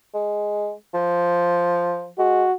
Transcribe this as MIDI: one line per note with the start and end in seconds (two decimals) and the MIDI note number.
0.14 0.72 56
0.94 2.09 53
2.19 2.45 56
2.19 2.53 66